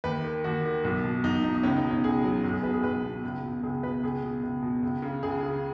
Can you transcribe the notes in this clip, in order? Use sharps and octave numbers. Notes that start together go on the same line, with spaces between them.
D#2 B4
D#3
D#2 F#4
D#3
B1
B2
B1 D#4
B2 D#4
D#4
C#2 C#4
D#4
B2
C#4
C#2 G#4
B2 F#3
B1
G#4
B2 B4
G#4
B1 B4
B2
C#2
B2
C#2 G#4
B2 B4
C#2 G#4
B2
C#2
B2
C#2
C#3
C#2 G#4
C#3